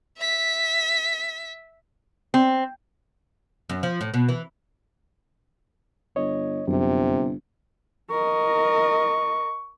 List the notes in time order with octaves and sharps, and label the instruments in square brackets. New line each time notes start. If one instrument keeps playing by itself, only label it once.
[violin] E5 B6
[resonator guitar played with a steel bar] C4
[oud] F#2
F3
A2
B2
E3
[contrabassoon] G1 [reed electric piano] C#5 D#5
[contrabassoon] G1 [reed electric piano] F#2 [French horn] C3
[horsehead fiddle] A#4 D#5 [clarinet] C#6